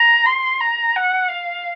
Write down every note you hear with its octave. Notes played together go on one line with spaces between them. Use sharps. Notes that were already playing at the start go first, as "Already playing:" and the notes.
Already playing: A#5
C6
A#5
F#5
F5